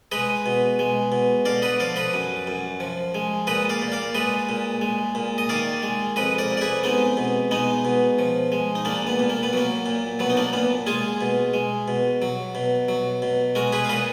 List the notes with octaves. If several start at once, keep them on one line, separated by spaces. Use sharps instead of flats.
G#3 B4 D#5
B2
G#3
B2
D3 D5 F5
B4 D#5
F3 D5 F5
B4 D#5
F#2
F#2
F3
G#3
A#2 B4 D#5
D5 F5
A#2
D5 F5
G#3 B4 D#5
A#2
G#3
A#2
D#5
D#3 D5 F5
G#3
F2 B4 D#5
A#4 D5
F2
D5
G#4 B4
G#3 B3 D#4
B2
G#3 B3 D#4
B2
F3
G#3
D#4
A#2 A#3 D4
B3
A#2
A#3
B3
F#3 A#3
A#2
F#3 B3
D#4
A#3 D4
A#2 B3
G#3 F4 G#4
B2
G#3
B2
F#3
B2
F#3
B2
G#3 F#4 A#4
G#4 B4
F5
A#2 B4 D#5